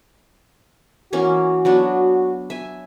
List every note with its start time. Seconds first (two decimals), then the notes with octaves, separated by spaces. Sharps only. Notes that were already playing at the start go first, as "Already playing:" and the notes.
1.13 E3 A#3 C#4 F#4
1.65 F#3 B3 D4
2.50 E5 G#5